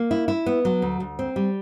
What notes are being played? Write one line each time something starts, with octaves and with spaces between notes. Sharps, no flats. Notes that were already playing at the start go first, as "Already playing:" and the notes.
Already playing: A#3
E4
E4
B3
F#3
D2
D2
C4
G3